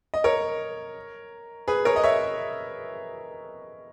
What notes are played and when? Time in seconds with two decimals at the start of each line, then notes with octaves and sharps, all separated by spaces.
0.14 D#5
0.24 A#4 C#5
1.68 G#4 B4
1.85 A#4 C#5
1.96 D#5
2.03 C#5 E5